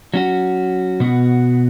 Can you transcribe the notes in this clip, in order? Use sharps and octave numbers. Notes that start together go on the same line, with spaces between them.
F#3 C#4 F#4
B2 B3 F#4